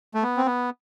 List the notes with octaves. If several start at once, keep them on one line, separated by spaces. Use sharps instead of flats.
A3
B3
C4
B3